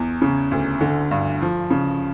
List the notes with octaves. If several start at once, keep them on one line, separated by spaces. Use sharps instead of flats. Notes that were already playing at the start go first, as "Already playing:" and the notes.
Already playing: E2
C#3
D2
D3
G2
F3
C#3